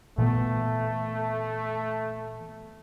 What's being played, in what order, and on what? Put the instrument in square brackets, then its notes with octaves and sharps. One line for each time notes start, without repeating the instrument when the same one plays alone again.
[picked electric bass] A#2 E3 B3 [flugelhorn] A3